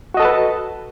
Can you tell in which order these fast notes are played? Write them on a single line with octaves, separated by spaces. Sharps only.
F#4 D#5 A4 A5 B4